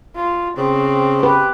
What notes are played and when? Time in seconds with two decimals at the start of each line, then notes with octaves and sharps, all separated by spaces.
0.16 F4
0.58 C#3 C4
1.23 G4 B4